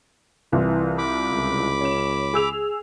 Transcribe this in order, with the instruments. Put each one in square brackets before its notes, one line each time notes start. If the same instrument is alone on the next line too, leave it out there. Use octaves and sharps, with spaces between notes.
[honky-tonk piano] C2 F4 [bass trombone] E3
[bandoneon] B5 D6
[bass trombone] C#2
[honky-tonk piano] C#4 E7
G#4 E6 F7